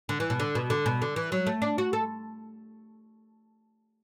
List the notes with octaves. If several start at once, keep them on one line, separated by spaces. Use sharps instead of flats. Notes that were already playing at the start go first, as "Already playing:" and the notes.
D3
E3
B2
D3
B2
D3
B2
D3
E3
F#3
A3
D4
F#4
A4